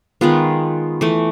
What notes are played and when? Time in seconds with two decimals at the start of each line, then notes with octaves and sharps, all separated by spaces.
0.21 D#3 G#3 B3 F4
1.01 E3 A3